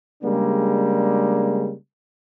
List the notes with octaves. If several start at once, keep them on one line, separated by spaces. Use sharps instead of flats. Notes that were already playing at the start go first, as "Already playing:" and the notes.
C#3 G3 G#3 A#3 D4